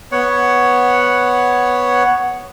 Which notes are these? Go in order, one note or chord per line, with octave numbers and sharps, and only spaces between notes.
B3 C#5 F#5